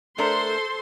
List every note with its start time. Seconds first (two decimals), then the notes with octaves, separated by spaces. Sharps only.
0.18 A3 D4 A4 A#4 C5 C6